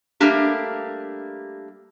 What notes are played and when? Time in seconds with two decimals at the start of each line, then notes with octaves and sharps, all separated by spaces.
0.20 G3 A3 A#3 D4 G4